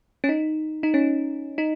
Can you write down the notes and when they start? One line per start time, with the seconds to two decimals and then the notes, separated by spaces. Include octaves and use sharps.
0.24 C#4
0.29 D#4
0.83 D#4
0.94 C#4
1.58 D#4